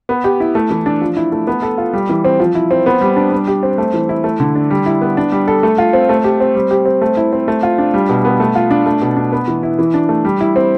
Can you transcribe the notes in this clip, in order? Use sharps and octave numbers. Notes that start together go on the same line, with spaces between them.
B3
G4
E4
A3
E3
D4
F3
E4
A3
B3
A4
F4
G3
E3
C4
F3
E4
C4
B3
G3
D4
G3
G4
C4
A3
E3
E4
A3
D3
D4
G3
E4
B3
D4
G3
A4
A3
F4
C4
A3
G4
C4
G3
G4
C4
A3
E4
C4
A3
F4
D4
G3
B2
B3
A3
F4
D4
A3
B2
D4
B3
E3
E4
E3
D4
A3
G3
E4
C4